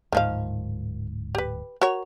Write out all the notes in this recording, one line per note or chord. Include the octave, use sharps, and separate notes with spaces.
D1 G#2 D#3 F3 F5
G4 B4
F#4 A#4 C#5